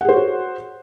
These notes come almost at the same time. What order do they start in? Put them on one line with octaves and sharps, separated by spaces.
F#5 G#4 C5 C#5 F#4